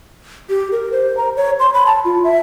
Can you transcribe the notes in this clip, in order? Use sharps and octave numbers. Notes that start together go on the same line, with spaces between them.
G4
A#4
C5
A#5
C#5
C6
B5
A5
F4
E5